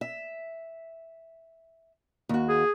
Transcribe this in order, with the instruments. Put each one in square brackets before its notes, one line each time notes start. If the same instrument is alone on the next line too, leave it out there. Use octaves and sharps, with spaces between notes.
[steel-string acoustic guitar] E5
D#2 F#4
[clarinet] G#4